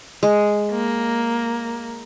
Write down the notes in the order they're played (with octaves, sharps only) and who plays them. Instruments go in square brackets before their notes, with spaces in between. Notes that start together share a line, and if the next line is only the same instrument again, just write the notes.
[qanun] G#3
[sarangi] A#3